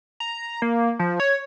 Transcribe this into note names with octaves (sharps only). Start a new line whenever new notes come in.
A#5
A#3
F3
C#5